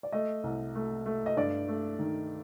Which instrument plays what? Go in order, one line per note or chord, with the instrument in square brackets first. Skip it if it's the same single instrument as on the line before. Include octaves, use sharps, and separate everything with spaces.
[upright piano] D5
A3 D#5
C2
A3
A3
D#5
G2 D5
A3
D#3